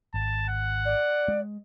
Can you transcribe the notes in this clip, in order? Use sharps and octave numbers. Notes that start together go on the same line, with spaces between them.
G#1 A5
F#5
D5
G#3